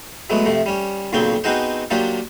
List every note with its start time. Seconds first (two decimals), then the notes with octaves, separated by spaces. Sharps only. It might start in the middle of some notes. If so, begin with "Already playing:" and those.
0.30 F#3 G#3 A3 B3
0.46 C3 F3 A3
0.66 G3 C#4
1.13 B1 A#2 C#3 F#3 C4 G5
1.44 B3 C4 D#4 F#4 G#4 C5
1.90 F#3 A#3 D4 F4 G4